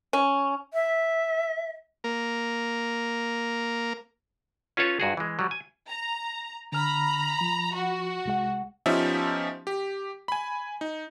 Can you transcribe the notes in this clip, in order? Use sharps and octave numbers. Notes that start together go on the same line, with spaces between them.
C#4
E5
A#3 A#4
C#4 F4 A4 B4 C#5 A5
G2 F#4 G#4
E3 G#3
F#3 G3
G#5
A#5
D3 A#5 B5 F6
F3
F#4
C2 G#3 F#5
F3 B3 C#4 D#4 G4 E5
G4
G#5 B5
D#4